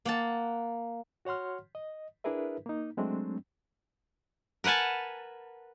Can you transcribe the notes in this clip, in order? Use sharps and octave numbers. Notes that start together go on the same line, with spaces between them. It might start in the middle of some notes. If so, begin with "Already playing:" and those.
A#3 F#5 A5
F#4 C#5 F#5 C6 F6
D#5
D4 E4 G#4 A#4 B4 E5
A#3 D#4
F#3 G#3 A3 C4 D4
A#4 B4 F#5 G#5 A5